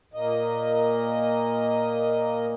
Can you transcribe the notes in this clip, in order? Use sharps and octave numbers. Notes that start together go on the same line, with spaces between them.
A#2 A#3 D#5